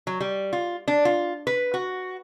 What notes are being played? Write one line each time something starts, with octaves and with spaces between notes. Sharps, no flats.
F#3
G3
F4
D4
F4
B4
F#4